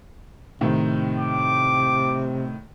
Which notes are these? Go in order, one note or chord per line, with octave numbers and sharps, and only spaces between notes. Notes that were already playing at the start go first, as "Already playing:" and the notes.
A2 C3 D#3
D6